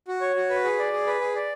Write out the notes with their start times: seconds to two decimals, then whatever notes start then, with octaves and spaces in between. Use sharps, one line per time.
0.08 F#4
0.21 C#5
0.36 F#4
0.50 B4
0.64 G#4
0.79 D5
0.93 G#4
1.07 B4
1.21 G#4
1.35 D5